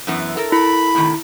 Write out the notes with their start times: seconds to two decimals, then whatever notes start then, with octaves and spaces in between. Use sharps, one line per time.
0.07 F#2 E3 B3
0.37 A4 A#4
0.52 E4 B5
0.95 A2 C3 D#3